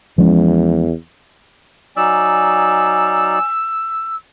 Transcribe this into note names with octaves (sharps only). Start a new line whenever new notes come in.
E2 F3 G#3 C#4
F#3 D#4 D5 G#5 E6